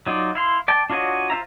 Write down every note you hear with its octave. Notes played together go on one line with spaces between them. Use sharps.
F#3 D#4 F4 D5
E4 F5 C6
D5 G5 A5
D4 F4 F#4 C#5 D#5
F4 C5 E5 A#5